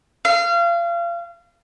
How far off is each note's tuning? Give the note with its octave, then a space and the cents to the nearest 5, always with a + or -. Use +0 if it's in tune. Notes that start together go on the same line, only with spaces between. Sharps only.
F5 -30